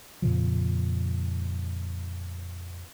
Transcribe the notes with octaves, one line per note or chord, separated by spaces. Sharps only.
F2 A#2 C#3 F3